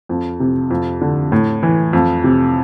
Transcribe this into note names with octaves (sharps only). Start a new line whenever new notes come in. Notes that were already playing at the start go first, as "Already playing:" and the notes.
F2
C3
F2
D3
A2
E3
F2
C3